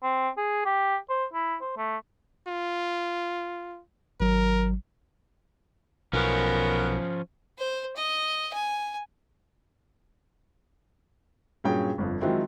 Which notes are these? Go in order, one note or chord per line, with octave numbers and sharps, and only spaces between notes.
C4
G#4
G4
C5
E4
C5
A3
F4
G#1 F#3 A#4
B1 F3 B3 C#4 A#4
C5
D#5
G#5
G2 A#2 F#3 C#4 G#4 G5
G1 F2
D#3 F3 F#3 G#3 C4 E4